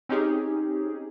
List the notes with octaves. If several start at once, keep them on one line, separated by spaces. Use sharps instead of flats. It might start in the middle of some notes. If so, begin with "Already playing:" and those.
C4 C#4 D#4 G4 G#4